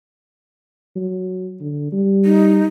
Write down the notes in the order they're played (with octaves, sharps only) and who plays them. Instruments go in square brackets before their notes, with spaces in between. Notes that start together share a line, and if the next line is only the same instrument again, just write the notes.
[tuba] F#3
D3
G3
[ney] D#4